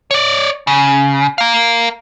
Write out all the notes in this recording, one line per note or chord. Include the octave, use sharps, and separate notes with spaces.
C#5 D5
C#3
A#4 F5